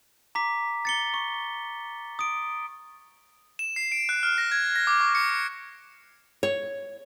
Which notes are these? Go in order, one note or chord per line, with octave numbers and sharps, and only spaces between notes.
A#5 D6 B6
A6 C#7 G7
C#6
D#6 D7
E7
C7
D7
F#6
F6
A#6
G#6
A#6
D6
C#6
C#7
C#7
C#5